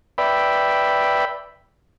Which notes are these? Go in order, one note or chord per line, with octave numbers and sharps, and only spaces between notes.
B4 D5 E5 G5 B5